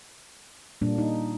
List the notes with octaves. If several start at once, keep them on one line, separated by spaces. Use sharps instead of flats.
A#2 G3 A#3 D4
D#4